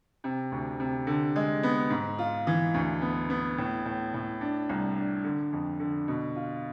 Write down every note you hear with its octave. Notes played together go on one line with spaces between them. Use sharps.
C3
D2
C3
D3
G#3
B3
G#2
F4
E3
D2
B3
B3
A2
A2
A2
D4
C2
D4
D3
F2
D3
B2
F4